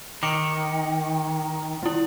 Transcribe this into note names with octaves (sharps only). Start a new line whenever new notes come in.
D#3 D6 C#7
G3 E4